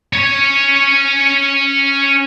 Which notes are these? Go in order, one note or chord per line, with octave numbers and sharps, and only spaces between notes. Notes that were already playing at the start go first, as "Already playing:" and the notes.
C#4 C#5